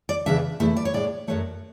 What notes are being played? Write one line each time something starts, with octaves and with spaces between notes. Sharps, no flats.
D5
E2 C#3 E3 B3 D4 E5
E2 B2 A3 E4 E5
D5
C#5
A2 G#3 D4 D5
F#2 C#3 F#3 A3 C#5